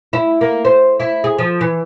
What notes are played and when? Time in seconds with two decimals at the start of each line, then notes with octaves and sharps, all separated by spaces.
0.13 E4
0.41 A#3
0.65 C5
1.00 E4
1.24 G#4
1.38 F3
1.61 E3